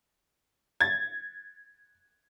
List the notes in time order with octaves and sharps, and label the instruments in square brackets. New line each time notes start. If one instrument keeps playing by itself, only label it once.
[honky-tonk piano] G#6 A6